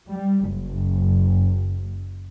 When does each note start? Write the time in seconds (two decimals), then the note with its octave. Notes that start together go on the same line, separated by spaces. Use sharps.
0.11 G3
0.49 F#1